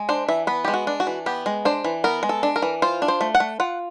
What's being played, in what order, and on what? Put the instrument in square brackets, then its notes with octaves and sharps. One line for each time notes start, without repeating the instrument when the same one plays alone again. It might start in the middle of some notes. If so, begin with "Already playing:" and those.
Already playing: [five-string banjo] G#3
D4 C5
E3 E5
B3 B4
G#3 G4
F#4
D4
F#4
E3
B3 G4
G#3
D4 C5
E3
B3 A#4
G#3
A4
D4
A#4
E3
F4 C5
D4
C5
A3
F#5
A3
F4 F#5